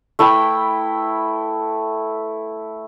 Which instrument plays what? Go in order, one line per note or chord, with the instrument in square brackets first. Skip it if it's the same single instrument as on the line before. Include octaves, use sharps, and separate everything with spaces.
[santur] A3 E4 B4 G5